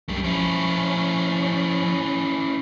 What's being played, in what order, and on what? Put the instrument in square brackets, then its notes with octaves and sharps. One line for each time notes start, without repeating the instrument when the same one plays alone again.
[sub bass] B1 [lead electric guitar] F#2 G3
[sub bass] F3 [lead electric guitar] C#4 E4